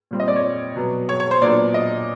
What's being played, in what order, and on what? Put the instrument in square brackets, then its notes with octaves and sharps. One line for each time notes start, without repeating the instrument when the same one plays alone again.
[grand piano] A#2 G3 C4
D#5
D5
C#5
B2 F#3 B3
C#5
C#5
C5
A#2 F#3 B3 D4 D5
D#5